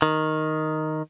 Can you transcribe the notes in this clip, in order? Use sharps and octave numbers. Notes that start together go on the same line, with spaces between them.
D#3